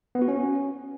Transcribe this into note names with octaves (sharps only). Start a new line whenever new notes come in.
B3
F#4
C#4